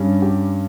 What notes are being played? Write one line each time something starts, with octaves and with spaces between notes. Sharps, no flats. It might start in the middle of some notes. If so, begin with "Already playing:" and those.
Already playing: G2 G3 C#4
G4